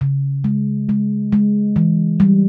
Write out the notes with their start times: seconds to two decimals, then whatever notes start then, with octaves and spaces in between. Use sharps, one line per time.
0.01 C#3
0.44 G#3
0.89 G#3
1.32 G#3
1.76 E3
2.20 G3